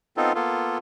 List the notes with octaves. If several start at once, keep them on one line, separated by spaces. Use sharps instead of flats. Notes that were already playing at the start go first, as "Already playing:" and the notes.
B3 C4 D#4 F4 A4
A#3 B3 F4 A4